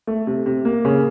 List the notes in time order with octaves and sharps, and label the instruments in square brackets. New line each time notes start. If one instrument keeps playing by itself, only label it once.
[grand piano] A3
C3
C3
A#3
C#3